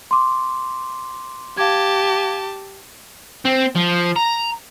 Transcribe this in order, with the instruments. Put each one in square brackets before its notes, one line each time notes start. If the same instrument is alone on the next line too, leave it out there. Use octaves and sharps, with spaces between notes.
[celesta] C6 D6
[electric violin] G4 A5 [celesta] F5 D6 G#6
[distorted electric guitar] C4
F3
A#5